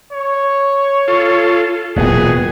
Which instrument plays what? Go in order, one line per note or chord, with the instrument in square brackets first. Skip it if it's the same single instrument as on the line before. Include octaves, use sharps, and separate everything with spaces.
[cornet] C#5
[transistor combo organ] F4 A4
[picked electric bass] E1 A#2 [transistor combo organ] F#3 B3 [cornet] G#4